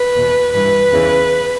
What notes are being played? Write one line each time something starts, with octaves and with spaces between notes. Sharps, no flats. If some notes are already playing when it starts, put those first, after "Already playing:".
Already playing: B4
E2 B2
G2 E3 B4
E2 C#3 E3